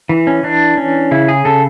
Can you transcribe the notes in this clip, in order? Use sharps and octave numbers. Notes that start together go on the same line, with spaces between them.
E3
C#4
E3 D4
C#4
C#3 E4
G#4
C#3 A4